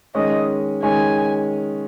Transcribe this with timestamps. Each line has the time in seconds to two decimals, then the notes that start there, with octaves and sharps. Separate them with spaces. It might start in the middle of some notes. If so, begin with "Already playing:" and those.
0.15 D#3 G#3 C#4 D#5
0.82 D#3 G#3 C#4 G#5